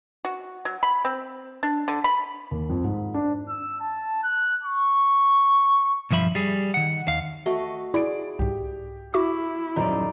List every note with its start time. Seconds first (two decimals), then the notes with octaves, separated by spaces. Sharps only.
0.25 F#4
0.65 F#3
0.83 B5
1.05 C4
1.63 D4
1.88 D3
2.04 B5
2.51 D#2
2.69 F2
2.84 G#2
3.14 D4
3.49 E6
3.80 A5
4.23 F#6
4.64 C#6
6.11 B1 G2 F3 E5 B5
6.35 G3 G#4
6.74 D#3 F#5
7.07 D#2 F5
7.46 A3 F#4 D#5
7.94 E4 G#4 D5 D7
8.39 C2 G#2 G4
9.14 E4 F#4 E5 D6
9.76 D#1 F#2 D#4 C5 D5